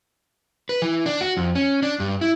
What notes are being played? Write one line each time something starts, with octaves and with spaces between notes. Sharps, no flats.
B4
E3
D4
F#4
F2
C#4
D4
G2
E4